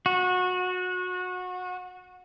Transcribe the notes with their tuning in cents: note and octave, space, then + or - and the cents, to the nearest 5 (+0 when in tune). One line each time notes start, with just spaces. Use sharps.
F#4 -25